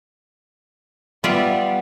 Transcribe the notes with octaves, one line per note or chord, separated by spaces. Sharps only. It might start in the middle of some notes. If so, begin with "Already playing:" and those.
G3 B3 F4 D5 E5